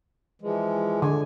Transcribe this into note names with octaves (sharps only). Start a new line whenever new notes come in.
E3 F3 G#3
D3 G#5